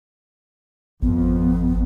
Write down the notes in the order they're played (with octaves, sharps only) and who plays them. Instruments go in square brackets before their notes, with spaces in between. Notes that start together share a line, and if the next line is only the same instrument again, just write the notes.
[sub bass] G#1 [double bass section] F2 [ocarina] B3